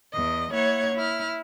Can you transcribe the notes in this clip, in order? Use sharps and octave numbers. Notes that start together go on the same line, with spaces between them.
E2 D#5
A#3 E4 C#5 F#5 G#6
E4 F6